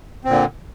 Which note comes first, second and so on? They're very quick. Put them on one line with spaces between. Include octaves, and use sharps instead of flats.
C4 A#2 D3